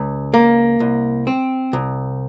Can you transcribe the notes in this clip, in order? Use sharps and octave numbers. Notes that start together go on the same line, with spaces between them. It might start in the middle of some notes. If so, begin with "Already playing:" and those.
Already playing: C#2
A#3
C2
C4
C2